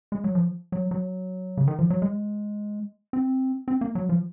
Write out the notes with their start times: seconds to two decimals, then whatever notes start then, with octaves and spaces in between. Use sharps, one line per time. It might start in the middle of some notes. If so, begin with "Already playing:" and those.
0.12 G#3
0.24 F#3
0.35 F3
0.72 F#3
0.91 F#3
1.57 C#3
1.68 D#3
1.79 F3
1.90 F#3
2.02 G#3
3.13 C4
3.68 C4
3.81 A#3
3.95 F#3
4.09 F3